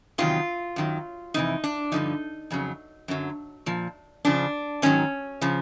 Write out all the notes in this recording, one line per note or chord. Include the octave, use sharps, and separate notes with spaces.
E2 C3 D#3 F#3 F4
F#2 D#3 F#3
F2 C3 E3 D#4
D4
G2 D3 F3 D#4
F2 C#3 F#3
F#2 D3 F#3
A#2 F3
F2 C#3 F3 D4
G#2 D#3 F#3 C#4
C#3 F3